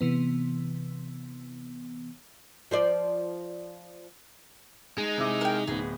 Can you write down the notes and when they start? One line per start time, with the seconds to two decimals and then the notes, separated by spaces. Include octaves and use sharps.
0.01 C3 E3 B3
2.71 F3 C5 D5
4.98 G#3 D#4
5.17 C3 E4 D6
5.41 A#4 G5
5.67 D1 B3 G#4